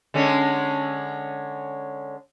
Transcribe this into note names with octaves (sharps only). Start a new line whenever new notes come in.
D3 G#3 C#4